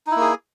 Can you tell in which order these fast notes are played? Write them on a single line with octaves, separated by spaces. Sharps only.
D#4 E4 A#3 G#4